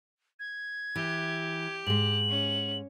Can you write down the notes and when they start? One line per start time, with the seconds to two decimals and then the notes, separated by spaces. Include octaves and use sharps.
0.40 G#6
0.96 E3 G4
1.87 G#2 G#3 F#7
2.29 C#4